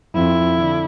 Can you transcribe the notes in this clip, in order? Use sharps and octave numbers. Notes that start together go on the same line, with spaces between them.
F2 E4
D3